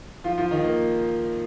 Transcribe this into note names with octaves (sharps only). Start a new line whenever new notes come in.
F3 F4
F3 F4
D#3 D#4
A#3